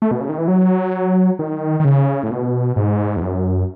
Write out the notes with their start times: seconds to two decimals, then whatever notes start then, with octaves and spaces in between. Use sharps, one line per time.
0.02 A3
0.11 B2
0.21 C#3
0.29 D#3
0.38 E3
0.48 F#3
1.39 D#3
1.80 D#3
1.85 C#3
2.23 A2
2.31 B2
2.76 G#2
3.17 E2
3.22 F#2